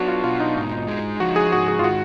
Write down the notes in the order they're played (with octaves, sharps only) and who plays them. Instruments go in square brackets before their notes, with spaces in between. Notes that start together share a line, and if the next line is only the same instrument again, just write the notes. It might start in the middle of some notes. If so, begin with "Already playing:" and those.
Already playing: [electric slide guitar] F#3 B3 [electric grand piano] D4 F#4
[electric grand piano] F4
[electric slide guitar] B2 [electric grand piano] F4
[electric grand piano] D#4
[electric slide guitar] G#2
G#3
[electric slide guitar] F3 [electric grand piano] F#4
[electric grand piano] G#4
[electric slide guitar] G#2 [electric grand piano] F#4
[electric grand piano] G#4
F4
[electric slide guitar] D#3 [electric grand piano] F#4